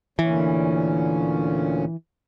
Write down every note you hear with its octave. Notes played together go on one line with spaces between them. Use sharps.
D2 A#2 E3 C#4